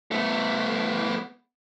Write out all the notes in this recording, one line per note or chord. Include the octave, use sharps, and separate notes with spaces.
A3 B3